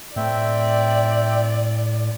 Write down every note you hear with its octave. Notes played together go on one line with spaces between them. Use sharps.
A2 C4 D5 E5 G5